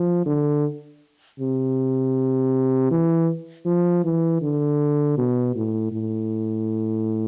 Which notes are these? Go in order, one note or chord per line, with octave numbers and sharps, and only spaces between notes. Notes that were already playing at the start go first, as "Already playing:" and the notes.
Already playing: F3
D3
C3
E3
F3
E3
D3
B2
A2
A2